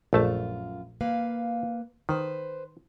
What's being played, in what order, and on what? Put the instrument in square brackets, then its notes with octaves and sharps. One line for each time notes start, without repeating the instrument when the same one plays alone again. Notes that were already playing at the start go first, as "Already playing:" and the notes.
[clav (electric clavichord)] A#1 A3 A5 [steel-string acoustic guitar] F#2 F4
[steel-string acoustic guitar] A#3 B4 F5
[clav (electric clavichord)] D#3 [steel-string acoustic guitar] B4 C5